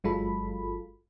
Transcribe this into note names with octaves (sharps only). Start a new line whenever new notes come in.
G1 F#3 G#3 F4 A4 B5